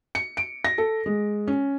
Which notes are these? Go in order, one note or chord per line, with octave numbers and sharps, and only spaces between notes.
C#7
D7
A#6
A4
G#3
C#4